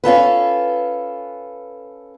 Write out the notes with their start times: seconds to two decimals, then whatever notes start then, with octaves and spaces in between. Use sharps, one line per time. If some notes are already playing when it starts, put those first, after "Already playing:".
0.04 C#4 F4 A4 B4